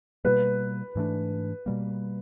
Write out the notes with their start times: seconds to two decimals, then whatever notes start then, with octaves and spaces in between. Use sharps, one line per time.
0.25 B2 G3 A#3 B4
0.95 G#2 E3 A3 D4
1.66 B2 G3 A#3